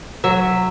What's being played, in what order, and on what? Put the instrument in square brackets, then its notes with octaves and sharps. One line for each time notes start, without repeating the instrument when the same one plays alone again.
[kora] F#3 E5